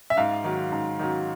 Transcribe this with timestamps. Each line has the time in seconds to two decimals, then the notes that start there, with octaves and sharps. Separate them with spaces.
0.10 E5
0.17 G#2 F5
0.44 D#3 F#3
0.72 G#2
0.99 D#3 F#3